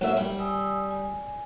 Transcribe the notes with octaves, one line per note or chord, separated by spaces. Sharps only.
F#3 A#3 E5
G3
G#5 D#6 E6
G#5